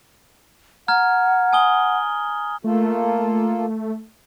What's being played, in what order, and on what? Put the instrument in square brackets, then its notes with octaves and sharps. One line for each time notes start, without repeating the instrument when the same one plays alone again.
[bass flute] F#5 [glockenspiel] A#5 F6 G#6
[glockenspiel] G#5 D#6 G7
[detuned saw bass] A3 [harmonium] A#3 F4 A4